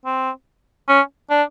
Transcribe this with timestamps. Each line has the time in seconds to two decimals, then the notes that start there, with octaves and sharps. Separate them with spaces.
0.05 C4
0.88 C#4
1.30 D4